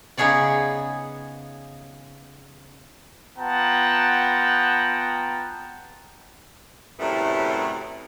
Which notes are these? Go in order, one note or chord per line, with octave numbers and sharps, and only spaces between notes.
C#3 B3 D#4 G#4 C#5 D5
B3 F4 F#5 G5 A5 A#5
F#2 A2 C3 G3 A3 B3